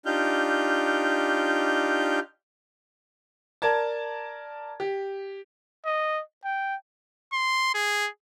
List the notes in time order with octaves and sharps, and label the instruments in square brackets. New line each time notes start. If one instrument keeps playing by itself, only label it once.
[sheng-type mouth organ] D4 D#4 F4 G4 F6 G6
[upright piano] A#4 D5 A5 G#6
G4
[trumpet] D#5
G5
[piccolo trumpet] C6
G#4